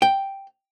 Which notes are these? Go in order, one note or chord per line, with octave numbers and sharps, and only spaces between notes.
G5